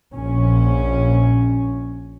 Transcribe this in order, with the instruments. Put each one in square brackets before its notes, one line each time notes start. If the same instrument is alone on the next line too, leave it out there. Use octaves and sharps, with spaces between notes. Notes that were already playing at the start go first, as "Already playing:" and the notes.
[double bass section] A#1 C#4